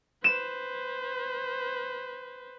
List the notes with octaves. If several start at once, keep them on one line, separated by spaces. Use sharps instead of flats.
B4 C5 E7